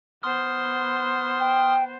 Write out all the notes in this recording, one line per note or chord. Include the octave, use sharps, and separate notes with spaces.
B3 C5 C6 D#6 F6
G5